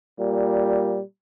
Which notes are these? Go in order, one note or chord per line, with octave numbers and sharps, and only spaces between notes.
A#2 G3